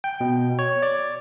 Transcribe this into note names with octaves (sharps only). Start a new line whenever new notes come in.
G5
B2
C#5
D5